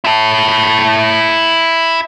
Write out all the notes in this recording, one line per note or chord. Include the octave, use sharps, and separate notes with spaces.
E4 A5